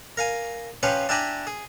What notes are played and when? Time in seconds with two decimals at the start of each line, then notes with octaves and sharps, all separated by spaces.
0.17 A#4 F5 G#5
0.83 F3 C#4 G4 B4 C#5 F5
1.09 D4 E4 G4 G#5 A#5 B5
1.47 G#4